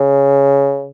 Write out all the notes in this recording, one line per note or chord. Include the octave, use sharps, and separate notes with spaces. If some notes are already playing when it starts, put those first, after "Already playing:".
Already playing: C#3